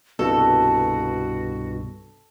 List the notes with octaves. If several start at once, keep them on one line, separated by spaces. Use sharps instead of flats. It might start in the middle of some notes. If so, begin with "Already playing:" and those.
C2 G2 B2 F#4 A4